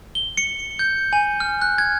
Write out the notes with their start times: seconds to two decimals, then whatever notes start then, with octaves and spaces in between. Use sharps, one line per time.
0.15 G7
0.37 C#7
0.79 G6
1.13 G#5
1.40 F6
1.62 F#6
1.78 G#6